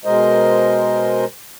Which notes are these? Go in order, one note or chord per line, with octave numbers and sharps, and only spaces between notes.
B2 G#3 A#4 C5 D#5